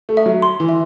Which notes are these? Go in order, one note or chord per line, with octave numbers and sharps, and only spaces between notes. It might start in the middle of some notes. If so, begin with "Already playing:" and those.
A3
E5
F#3
C6
E3
E5